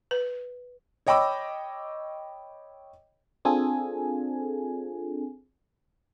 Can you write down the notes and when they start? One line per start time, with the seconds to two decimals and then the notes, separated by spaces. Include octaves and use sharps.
0.11 B4
1.07 C#5 D#5 G5 B5 D6 E6
3.45 C4 D4 F4 G#4 A4 G#5